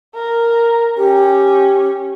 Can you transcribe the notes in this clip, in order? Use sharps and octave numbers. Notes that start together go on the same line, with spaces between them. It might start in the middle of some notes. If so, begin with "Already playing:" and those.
A#4
C#4 G4